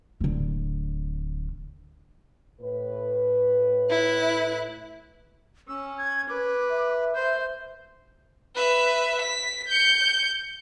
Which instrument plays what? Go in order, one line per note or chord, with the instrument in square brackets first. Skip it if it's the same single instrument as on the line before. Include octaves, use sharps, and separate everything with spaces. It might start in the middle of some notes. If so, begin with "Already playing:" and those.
[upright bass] D1 D3
[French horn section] A2 B4
[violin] E4 F#6
[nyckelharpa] C#4 [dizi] E6
[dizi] G#6
[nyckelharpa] B4 [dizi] D6
[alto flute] E5
[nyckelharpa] C5 [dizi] G6
[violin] B4 E5
B6
G6 C#7